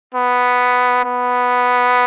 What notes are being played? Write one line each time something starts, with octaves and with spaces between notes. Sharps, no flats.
B3
B3